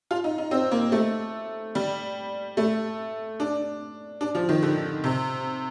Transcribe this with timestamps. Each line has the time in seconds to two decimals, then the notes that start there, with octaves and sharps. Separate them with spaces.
0.11 F4
0.24 D#4
0.38 D#4
0.51 C4
0.71 A#3
0.92 A3
1.75 G3
2.57 A3
3.40 D4
4.21 D4
4.35 F3
4.49 D#3
4.63 D3
5.04 C3